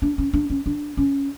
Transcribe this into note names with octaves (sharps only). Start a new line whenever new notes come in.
D4
C#4
D4
C#4
D4
C#4